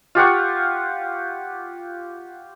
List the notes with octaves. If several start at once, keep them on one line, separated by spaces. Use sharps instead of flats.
F4 G4 F#5 C#6